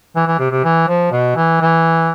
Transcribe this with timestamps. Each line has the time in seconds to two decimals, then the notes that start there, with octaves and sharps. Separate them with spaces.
0.16 E3
0.27 E3
0.39 C3
0.51 C3
0.64 E3
0.88 F3
1.11 B2
1.35 E3
1.60 E3